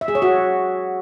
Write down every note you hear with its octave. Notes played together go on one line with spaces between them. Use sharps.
E5
G#4
C#5
F#4